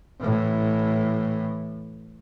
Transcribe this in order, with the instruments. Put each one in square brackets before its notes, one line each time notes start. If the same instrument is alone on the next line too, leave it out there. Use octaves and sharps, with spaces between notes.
[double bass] A2 E3